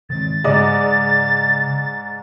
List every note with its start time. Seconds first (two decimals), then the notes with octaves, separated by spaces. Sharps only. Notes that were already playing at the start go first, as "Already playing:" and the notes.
0.10 D#3 G#3 C4 A6
0.44 G#2 C#3 D5 D#5